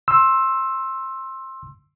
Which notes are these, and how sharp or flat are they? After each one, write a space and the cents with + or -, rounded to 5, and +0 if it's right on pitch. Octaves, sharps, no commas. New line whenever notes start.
C6 +20 E6 +0